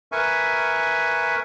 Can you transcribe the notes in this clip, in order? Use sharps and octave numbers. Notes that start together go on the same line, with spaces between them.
A#4 B4 E5 G#5 C#6